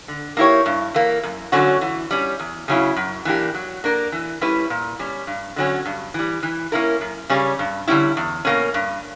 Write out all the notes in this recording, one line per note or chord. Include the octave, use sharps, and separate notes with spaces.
D3
A#3 E4 G4 C#5
G2
E3 A#3
F#2
D3 F#3 C#4 F#4
E3
G3 C#4
E2
C#3 F#3 C#4 E4
F#2
E3 A#3 D4 G4
F#3
A#3 D4 A#4
E3
G3 C#4 E4 B4
A#2
G3 C#4
G2
D3 F#3 C#4
G2
E3 G3
E3
A#3 C#4 E4 A#4
F#2
C#3 G3 C#4
G2
D3 G3 C#4 E4
E2
B2 A#3 C#4
G2